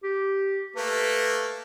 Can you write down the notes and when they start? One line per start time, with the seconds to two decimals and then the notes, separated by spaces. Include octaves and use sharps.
0.04 G4
0.76 A3 A#3 B4